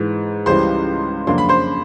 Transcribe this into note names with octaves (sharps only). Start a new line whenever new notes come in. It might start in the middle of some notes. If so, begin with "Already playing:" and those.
Already playing: G#2 E3 G#3
C#2 C#3 E3 G3 C5 C6
F2 C#3 F#3 A#3 D4 C6
B5
C5 C6